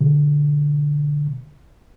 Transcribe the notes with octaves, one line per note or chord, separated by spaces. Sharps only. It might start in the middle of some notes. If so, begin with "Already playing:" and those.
B2 D3